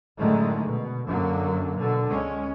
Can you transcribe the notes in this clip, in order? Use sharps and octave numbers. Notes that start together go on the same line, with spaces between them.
F#2 A2 D3 D#3 G#3 A3
B2
F#2 D3 F#3 A#3
B2 D3
C#2 G#3 C#4